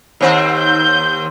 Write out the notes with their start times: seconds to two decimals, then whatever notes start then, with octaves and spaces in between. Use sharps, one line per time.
0.21 D#2 C4
0.59 G6